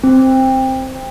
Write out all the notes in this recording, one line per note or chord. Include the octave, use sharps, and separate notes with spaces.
C4